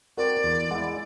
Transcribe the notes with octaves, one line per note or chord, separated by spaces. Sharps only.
C4 F#4 A#4 D5
E2
G#3 E4 F#5